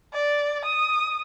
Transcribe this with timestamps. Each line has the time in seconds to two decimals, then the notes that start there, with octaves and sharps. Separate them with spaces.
0.13 D5
0.65 D#6